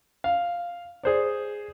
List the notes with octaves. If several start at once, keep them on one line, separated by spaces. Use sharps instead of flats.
F5
G#4 C5 D5